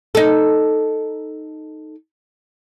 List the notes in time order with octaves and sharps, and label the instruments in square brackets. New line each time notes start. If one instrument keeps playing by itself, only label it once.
[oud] D#4 A4